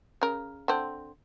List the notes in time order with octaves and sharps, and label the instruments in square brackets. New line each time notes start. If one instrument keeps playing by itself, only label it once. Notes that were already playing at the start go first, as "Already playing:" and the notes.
[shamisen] C#3 A#4
D3 C4